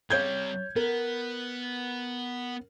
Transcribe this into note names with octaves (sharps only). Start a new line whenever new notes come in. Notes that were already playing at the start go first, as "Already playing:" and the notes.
C3 G3 C#5 G6 G#6
B3 A#4